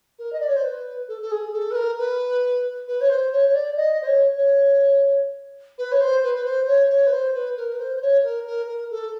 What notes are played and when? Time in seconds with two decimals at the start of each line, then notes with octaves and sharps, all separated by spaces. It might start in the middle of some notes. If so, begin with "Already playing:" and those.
0.18 A#4
0.32 D#5
0.40 D5
0.47 C#5
0.55 C5
0.64 B4
1.08 A4
1.21 A4
1.31 G#4
1.52 A4
1.71 B4
1.75 A#4
1.98 B4
2.87 B4
3.00 C#5
3.09 C5
3.32 C#5
3.48 C#5
3.54 D5
3.76 D#5
4.01 C5
4.06 C#5
4.35 C#5
5.78 B4
5.91 C#5
6.00 C5
6.23 B4
6.34 B4
6.44 C5
6.67 C#5
6.89 C#5
7.06 B4
7.11 C5
7.34 B4
7.57 A#4
7.73 B4
7.79 C5
7.96 C5
8.01 C#5
8.23 A#4
8.46 A#4
8.68 A#4
8.90 A4